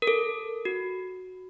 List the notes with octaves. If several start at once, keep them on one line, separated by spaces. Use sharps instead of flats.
A#4
A4
F#4